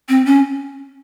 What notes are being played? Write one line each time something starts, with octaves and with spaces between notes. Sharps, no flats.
C4
C#4